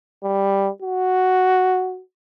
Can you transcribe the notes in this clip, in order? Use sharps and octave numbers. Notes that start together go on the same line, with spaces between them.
G3
F#4